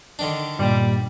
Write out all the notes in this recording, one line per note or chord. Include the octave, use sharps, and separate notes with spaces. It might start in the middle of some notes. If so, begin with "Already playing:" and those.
D3 D#3 D4
G2 A#2 G3 A#3